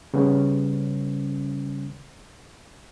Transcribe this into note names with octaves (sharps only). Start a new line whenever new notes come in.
C#3 G3 B3 C#4